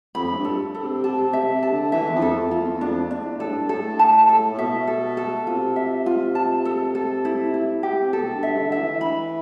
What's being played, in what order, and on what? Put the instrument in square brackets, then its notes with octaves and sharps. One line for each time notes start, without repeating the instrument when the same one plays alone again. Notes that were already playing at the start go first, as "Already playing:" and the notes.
[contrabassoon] F2 [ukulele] B5
[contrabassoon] A2
G2
[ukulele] A4
A4
[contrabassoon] C3
[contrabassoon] C3 [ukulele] A5
[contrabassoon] C3
[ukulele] E5
[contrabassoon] C3
[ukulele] A5
[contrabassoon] D3
[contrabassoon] E3 [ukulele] E5
[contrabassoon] E2
F2
[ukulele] A4
[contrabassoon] E2
F2
[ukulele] F4
[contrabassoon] E2
E2
[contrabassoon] F2 [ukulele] D4
[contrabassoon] E2
[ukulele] D4
[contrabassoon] E2
[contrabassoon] A2 [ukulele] A4
[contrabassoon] G2
[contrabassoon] A2 [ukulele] A4
[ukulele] A5
A4
[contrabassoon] A2
[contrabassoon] B2 [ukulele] E5
[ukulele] A4
A4
[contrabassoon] C3 [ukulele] F4
[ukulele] E5
F4
A5
A4
A4
E4
E4
G4
[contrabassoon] C3
[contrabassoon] B2 [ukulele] A4
[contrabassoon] G2
[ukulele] E5
[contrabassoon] D3
[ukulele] E5
[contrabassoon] E3
[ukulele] B5